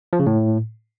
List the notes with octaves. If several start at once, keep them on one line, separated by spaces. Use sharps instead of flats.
F3
C#3
A2